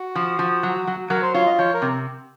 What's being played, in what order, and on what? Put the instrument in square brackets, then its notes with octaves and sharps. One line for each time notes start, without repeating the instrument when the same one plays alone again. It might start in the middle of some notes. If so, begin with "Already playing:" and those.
Already playing: [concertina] F#4
[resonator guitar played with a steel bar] F3
F3
F#3
F#3
[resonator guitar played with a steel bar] F#3 [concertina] A#4
[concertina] C5
[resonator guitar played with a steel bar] F4 [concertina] C#5
[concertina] D#5
[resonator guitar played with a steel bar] F3 [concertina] C#5
[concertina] A#4
[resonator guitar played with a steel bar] C3